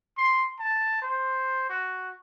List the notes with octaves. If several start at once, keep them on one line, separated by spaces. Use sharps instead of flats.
C6
A5
C5
F#4